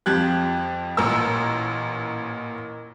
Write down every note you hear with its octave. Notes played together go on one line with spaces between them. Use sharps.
F2 F3 G4 F#6 G#6
A1 A#2 A#4 E6